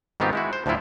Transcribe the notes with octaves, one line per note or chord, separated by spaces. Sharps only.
G#2 D#3 B3 C4 F4 G4
G#3 E4 F#4
C5
D2 A2 F3 F#3 E4 F4